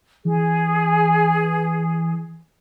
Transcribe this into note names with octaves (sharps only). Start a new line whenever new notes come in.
E3 G#4